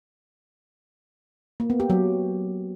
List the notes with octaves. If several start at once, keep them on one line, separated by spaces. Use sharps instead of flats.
A#3
B3
G4
F#3